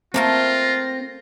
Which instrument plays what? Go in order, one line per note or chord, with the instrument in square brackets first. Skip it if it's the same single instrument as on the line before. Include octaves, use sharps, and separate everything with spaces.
[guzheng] A3 A#3 A#4 [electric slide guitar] C4 [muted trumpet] F4 [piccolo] A#6